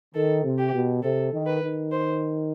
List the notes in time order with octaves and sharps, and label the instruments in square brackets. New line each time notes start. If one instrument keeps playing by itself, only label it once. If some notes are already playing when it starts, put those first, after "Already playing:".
[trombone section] D#3 [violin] A4
[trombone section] C3
[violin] G4
[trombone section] B2
[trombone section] C3 [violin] A4
[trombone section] D#3
[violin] B4
[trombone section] D#3
[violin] C5